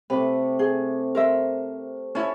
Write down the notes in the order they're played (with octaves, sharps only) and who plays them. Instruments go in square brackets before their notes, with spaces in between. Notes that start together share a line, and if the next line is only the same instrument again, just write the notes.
[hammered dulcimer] C3 A3 [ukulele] B4
[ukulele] G#4
A#4 C5 E5
[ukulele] C#4 E4 [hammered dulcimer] C#5 A5